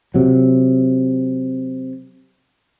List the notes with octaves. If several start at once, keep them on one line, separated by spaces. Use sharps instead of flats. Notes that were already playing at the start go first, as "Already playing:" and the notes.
C3 F#3